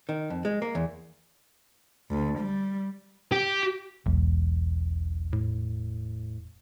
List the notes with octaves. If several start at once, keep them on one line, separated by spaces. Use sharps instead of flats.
D#3
F2
G#3
A#3
E2
D2
G3
G4
E1 B1
A2